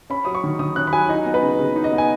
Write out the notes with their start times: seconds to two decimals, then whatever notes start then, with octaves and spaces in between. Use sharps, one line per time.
0.10 C#4 B5
0.25 F#3 D#6
0.35 C#6
0.44 D#3
0.59 D#3 D#6
0.76 C#4 F#6
0.87 B5
0.93 F#3 G#5
1.09 D#4 D#5
1.26 B3
1.34 B4
1.43 C#3
1.59 C#3
1.76 D#4
1.84 D#5
1.92 B3
1.98 G#5